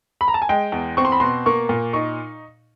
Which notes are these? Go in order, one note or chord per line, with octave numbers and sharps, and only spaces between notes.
B5
A#5
A5
G#5
G#3 G5
E2
C4 C#6
C6
B5
B2 C6
A#3 C#6
A#2
D#4 C#6